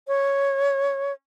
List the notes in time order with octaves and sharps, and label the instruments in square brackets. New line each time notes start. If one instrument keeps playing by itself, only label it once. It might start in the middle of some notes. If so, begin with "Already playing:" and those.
[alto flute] C#5